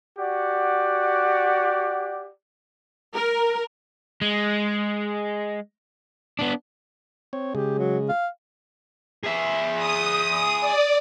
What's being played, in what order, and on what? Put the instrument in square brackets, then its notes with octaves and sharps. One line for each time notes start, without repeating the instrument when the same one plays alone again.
[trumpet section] F#4 G4 D5 F#5
[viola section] A#4
[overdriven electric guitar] G#3
B3 D4
[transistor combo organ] C4 C#5
[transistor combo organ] C#3 G#3 [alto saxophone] G4
[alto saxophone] F#3
F5
[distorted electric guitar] G#4 E5
[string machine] D#6
D5